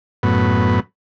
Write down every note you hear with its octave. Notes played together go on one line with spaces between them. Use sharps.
F#2 A2 B3